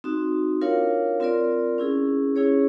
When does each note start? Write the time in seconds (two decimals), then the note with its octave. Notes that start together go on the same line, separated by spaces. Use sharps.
0.04 C4 D#4 F#4
0.61 D4 F4 A#4 C#5 F5
1.20 C4 F4 A#4 D5
1.78 C#4 E4 G#4
2.36 C#4 E4 G#4 C#5